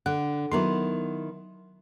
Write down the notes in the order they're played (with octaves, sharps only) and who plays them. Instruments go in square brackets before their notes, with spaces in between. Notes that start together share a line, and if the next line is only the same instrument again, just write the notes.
[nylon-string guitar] D3 [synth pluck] F#5
[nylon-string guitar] D#3 B3 E4 [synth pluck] F#3 A#4 C6